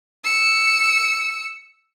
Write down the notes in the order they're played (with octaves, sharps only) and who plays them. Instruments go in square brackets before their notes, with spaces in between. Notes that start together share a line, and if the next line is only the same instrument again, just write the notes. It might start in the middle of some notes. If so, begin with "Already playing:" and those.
[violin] E6 C#7